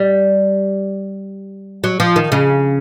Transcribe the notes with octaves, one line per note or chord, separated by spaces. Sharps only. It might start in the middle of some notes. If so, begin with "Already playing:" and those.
Already playing: G3
F#3
F3
D#3
C#3